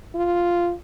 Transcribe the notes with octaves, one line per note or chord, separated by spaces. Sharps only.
F4